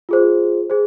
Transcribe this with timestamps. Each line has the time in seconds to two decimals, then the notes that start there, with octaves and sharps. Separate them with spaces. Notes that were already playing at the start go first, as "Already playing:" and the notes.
0.09 F4 G#4 C5
0.70 G#4 C5